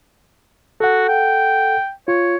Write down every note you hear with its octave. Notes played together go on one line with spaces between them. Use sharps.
F#4 A4 F#5
G5
F4 C#5